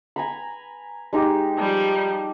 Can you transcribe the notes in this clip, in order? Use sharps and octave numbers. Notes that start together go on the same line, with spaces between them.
G#5 A#5 B5
G#3 D#4 G4
F3 G3 A5